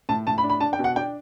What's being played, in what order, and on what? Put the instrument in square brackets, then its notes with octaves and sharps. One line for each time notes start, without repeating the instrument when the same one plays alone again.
[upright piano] A2 A5
A2 A5
B5
D4
B5
D4 A5
G5
B2
F#5
D4 G5